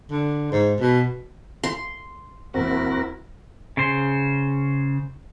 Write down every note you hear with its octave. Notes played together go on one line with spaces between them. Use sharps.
D3
G#2
B2
C6
D#1 E2 A#3 C4 E4 F#4 A#4
C#3 C5